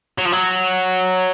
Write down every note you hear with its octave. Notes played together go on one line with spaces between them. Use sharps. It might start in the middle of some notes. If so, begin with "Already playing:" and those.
F#3
F3
F#3